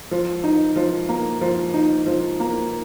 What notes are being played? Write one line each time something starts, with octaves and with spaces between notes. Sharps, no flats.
F3
D#4
F3
A#3
F3
D#4
F3
A#3